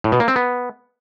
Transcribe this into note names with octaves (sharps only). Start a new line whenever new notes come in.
A2
B2
A#3
C4
B3